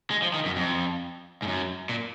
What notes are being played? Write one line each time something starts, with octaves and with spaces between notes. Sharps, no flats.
G#3
F3
D#3
F#2
F2
G#2
F#2
A#2